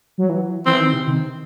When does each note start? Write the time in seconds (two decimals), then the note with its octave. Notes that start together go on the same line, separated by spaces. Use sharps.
0.18 F#3
0.29 E3
0.66 E3 C4
0.80 D#3
0.93 C3
1.07 D#3